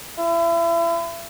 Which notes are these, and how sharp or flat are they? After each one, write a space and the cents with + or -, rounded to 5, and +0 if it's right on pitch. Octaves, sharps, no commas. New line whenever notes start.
E4 +35